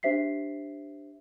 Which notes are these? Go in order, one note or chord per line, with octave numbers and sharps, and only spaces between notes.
D4 G4 C5 E5 B6 C7